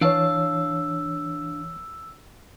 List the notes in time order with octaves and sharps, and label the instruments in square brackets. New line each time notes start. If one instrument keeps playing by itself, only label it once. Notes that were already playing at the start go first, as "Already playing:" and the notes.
[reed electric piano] E3 C#5 [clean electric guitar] D4 F5 A5 [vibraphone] E6